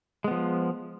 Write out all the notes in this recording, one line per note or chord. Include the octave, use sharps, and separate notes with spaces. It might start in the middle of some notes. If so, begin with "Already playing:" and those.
F3 G#3 B3